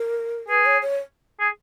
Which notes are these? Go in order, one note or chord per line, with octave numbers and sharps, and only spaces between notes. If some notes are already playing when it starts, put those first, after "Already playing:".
Already playing: A#4
G#4 B4
C#5
C#5
G#4